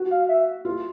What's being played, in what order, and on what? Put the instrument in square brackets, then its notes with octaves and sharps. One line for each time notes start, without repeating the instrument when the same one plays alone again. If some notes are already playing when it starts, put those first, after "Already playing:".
Already playing: [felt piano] F#4
[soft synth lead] F5
E5
[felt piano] F4